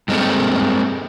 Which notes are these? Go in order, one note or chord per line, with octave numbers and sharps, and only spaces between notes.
G2 G#3 A#3 C4 A4